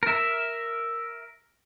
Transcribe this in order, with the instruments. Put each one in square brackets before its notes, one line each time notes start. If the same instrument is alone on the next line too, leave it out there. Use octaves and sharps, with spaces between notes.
[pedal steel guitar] A#4 E5